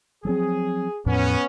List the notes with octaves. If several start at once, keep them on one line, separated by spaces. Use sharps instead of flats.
F3 F#3 C4 G#4
E2 A2 F3 B3 C#4